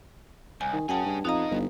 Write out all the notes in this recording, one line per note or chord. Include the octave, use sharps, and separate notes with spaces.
C2 G#5
D#3
F#2 C#4 G#4 F#5 G5 A5
G2
F2 B3 D#4 D#5 F5 A#5
G1